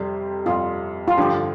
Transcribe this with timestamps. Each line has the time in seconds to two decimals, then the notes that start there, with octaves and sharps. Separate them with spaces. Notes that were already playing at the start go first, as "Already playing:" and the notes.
Already playing: F2 C3 G3
0.46 F2 C3 G3 F4
1.08 F4
1.17 G2 D3 F3 G4